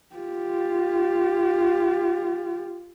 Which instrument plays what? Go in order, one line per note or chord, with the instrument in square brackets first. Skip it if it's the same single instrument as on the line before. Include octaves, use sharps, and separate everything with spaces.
[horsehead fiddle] F4 G4